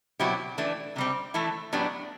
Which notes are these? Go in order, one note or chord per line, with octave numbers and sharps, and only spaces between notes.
B2 F#3 C4 E4 G4
E3 A3 D4
C3 G3 C4
E3 A3 E4 A4
A2 F#3 B3 D4 G4